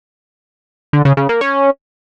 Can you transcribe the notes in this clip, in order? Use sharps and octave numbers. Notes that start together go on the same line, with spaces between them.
D3
C#3
C#3
A#3
C#4